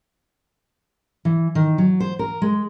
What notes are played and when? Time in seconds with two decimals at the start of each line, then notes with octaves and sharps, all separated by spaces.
1.25 E3
1.55 D#3
1.78 F#3
2.00 C5
2.19 A#4
2.42 G#3